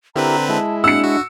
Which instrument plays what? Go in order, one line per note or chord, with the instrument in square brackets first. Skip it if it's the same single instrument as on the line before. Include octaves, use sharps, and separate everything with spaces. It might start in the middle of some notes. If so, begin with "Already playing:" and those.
[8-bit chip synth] D3 C4 B4 [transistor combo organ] E4 G4 A#4 [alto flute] A#5
[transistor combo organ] G#3 E4 [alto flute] A5
[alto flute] D4 [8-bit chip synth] F#5 [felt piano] E6 C#7
[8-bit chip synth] F#4